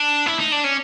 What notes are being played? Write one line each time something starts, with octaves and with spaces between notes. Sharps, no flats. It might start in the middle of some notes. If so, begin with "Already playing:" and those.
Already playing: D4
E4
D#4
D4
C#4